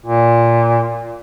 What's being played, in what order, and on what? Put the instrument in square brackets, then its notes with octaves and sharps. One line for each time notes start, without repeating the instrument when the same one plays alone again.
[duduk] A#2